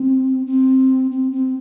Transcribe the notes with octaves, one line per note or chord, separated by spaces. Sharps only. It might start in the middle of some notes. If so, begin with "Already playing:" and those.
Already playing: C4
C4
C4
C4